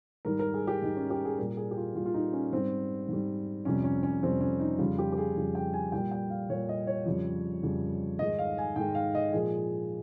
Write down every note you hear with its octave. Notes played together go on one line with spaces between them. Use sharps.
G#2 D#3 G3 A#4
A#4
G#4
G4
G#2 D#3 G3 D#4
C#4
G4
G#4
A#2 G3 A#4
G#4
G4
F4
A#2 G3 F4
F4
D#4
C#4
G#2 G3 C4
G#2 G3
F2 C3 G3 C#4
C#4
C#4
F2 C3 G3 C4
C#4
D#4
F2 C#3 G3 F4
G4
G4
G#4
F2 C#3 G3
G5
G#5
A#2 G3 G5
G5
F5
A#2 G3 C#5
D#5
C#5
F2 C#3 G3
F2 C#3 G3
G#2 D#3 G#3 D#5
F5
G#5
G#2 D#3 G#3 G5
F5
D#5
A#2 F3 G#3 G#4